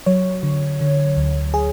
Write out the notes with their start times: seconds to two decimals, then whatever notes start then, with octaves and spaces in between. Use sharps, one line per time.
0.06 F#3 C#5
0.43 D3
0.81 D3
1.17 D2
1.54 G#4